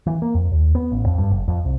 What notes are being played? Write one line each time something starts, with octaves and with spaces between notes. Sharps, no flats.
E3
A#3
F2
D#2
B3
A1
F2
G2
F#1
F2
C2